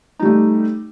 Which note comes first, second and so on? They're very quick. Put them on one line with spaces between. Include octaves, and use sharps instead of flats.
D#4 G3 A3